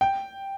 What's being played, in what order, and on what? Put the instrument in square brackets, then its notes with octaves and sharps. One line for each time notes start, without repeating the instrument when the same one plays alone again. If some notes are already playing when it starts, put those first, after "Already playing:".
[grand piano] G5